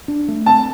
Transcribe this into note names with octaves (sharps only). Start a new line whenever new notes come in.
D4
A3
C4 A5